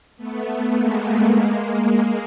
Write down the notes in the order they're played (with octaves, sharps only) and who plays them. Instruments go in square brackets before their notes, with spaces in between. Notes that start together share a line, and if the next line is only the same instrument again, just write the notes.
[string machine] A3 B3
G#3 A#3
A3
G#3 A#3
G#3 A#3